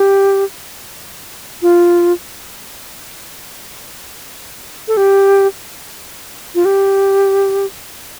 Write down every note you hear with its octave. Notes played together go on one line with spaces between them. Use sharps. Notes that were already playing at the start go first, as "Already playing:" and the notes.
Already playing: G4
F4
A4
G4
F4
G4